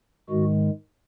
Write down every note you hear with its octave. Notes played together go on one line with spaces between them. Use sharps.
G#2 D#3 G#3 F#4